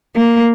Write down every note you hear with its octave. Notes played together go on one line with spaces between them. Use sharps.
A#3